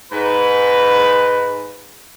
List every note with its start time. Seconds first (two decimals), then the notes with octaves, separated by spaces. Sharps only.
0.12 G#2 B4